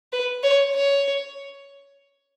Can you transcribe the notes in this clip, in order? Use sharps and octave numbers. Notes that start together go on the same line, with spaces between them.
B4
C#5
C#5